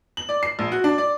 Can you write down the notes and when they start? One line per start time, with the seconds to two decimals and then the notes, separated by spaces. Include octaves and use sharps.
0.17 F#7
0.29 D5
0.43 C7
0.59 A#1
0.72 F#4
0.84 D4
0.98 D5